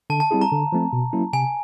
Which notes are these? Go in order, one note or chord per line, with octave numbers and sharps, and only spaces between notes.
D3 A5
A5
G3 C4 E4 G#4
A#5
D3
F3 A3 C4
B2
F#3 A#3 C#4 E4
C3 G#5